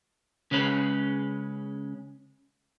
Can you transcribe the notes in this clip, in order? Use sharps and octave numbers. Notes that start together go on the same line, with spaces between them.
C#3 G#3 C#4 B4